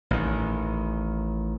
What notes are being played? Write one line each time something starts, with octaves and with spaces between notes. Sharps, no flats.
A1 D#3